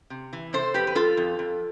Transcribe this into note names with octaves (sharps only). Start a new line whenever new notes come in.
C3
E3
C3 A4 C5
F2 G4 B4
B4
F2 F4 A4
F2
F2